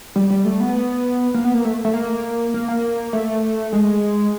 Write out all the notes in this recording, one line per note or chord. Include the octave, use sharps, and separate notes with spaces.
G3
G3
A3
B3
A#3
B3
A#3
A3
A3
A#3
A#3
A#3
A3
G#3